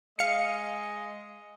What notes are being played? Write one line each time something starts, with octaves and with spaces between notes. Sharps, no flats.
G#3 D#5 F5 C#7